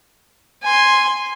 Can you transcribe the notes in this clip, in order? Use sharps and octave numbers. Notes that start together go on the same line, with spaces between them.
G#5 C6